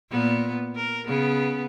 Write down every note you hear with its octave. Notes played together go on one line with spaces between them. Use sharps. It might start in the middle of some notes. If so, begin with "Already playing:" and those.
A#2 B3
A#4
C#3 B3